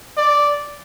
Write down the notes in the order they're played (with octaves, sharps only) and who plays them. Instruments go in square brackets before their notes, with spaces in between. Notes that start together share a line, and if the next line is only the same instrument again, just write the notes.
[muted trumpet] D5